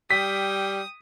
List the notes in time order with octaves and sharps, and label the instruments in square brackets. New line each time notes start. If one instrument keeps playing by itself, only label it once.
[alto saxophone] G3 [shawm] G5 [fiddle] D#6 [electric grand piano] B6